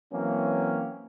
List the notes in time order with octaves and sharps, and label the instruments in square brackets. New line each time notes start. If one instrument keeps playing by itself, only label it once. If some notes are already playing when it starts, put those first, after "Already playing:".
[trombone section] E3 F#3 A#3 C4 C#4